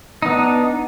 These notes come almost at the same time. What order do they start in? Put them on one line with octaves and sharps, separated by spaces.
D#4 B3 D4